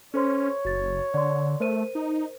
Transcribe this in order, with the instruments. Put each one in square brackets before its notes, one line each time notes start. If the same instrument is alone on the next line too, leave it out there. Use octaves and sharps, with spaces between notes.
[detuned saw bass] C#4 [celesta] A4 C5 C6 [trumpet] C#5
[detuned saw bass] F#1 [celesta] F#4 A6
[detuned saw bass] D3 [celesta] D5 C6
[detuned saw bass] A3 [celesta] A#4 C5 D#7
[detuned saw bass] D#4